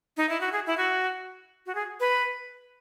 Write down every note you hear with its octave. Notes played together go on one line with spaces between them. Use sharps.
D#4
E4
F#4
G#4
E4
F#4
F#4
G#4
B4